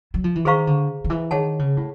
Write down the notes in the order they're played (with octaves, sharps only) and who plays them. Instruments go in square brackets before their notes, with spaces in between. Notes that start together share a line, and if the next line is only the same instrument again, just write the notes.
[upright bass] F#3
F3
E3
[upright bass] D#3 [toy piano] G#4 C5 F5 A#5 C#6
[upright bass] D3
D#3
E3
[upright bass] D#3 [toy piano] G#4 C#5 F#5 A5
[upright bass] C#3
A2